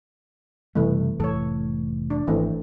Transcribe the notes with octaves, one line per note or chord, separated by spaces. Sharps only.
F#1 C3 E3 G3 A3
F1 A2 E3 A4 C#5
D4
G#1 E3 A3 C4